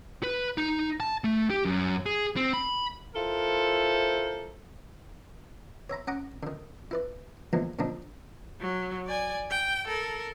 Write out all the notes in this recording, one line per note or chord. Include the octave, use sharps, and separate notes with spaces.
B4
D#4
A5
A3
G4
F#2
G#4
C4
B5
E4 F4 A4 A#4 C5
C#5 E5 A#5 B5
C#4 F#5 A#5 D6 D#6
D3 D#3
E4 B4 D5
E2 D3 E3 F3 G#3 A#3
A#2 D3 F3 D4 D#4
F#3
D5 G#5
G5
A4 A#4